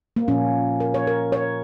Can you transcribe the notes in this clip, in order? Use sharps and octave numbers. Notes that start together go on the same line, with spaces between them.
A#3
A#2 F3 A#3 C#4
A#4
C#5
A#4
C#5